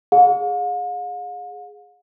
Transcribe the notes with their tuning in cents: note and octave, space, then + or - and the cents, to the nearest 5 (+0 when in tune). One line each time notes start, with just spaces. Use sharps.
G#4 +0 F5 +45